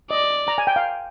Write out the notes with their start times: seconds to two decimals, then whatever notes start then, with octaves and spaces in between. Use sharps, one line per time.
0.11 D5 D#5
0.48 A#5
0.58 G#5
0.67 G5
0.76 F5